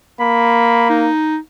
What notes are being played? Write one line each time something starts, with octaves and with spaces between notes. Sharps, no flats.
A#3 B5
D#4